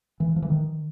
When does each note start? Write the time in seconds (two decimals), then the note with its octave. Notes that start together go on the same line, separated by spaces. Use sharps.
0.20 E3
0.36 F3
0.42 E3
0.50 D#3